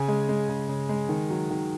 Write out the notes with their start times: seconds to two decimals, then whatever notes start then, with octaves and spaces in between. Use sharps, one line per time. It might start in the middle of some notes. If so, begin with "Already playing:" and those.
Already playing: C#3 G#5
0.08 G#3
0.29 G#3
0.49 C#3
0.69 C#3
0.89 G#3
1.09 D#3
1.30 F#3
1.51 D#3